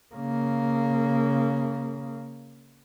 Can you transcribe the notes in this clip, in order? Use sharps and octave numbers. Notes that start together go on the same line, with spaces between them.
C#3 A#3